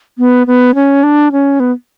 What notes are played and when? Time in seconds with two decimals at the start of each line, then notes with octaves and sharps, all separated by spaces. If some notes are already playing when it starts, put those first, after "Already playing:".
0.18 B3
0.47 B3
0.75 C#4
1.03 D4
1.32 C#4
1.60 B3